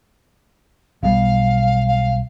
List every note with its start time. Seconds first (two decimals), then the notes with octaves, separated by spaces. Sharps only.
1.03 B1 B2 G3 F5
1.87 F5